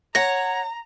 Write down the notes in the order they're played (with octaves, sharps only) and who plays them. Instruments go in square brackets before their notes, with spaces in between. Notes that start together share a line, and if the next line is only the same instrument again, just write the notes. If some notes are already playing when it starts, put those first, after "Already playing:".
[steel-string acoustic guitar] C#5 F#5 [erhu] A#5 [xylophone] A#6